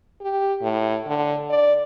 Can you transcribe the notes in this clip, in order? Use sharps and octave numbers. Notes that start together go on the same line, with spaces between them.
G4
A2
D3
D5